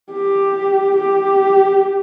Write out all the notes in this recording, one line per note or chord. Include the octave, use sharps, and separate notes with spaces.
G4
G4